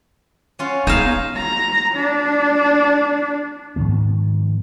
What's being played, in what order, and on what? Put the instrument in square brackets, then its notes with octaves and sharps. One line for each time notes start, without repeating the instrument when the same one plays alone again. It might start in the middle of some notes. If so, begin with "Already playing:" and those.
[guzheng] C#4 F4 F#4
[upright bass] B3 [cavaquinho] D#4 F5 [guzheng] G#4 [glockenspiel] G6 E7
[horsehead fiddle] A#5
D4
[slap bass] G#2 D#3 F3 B3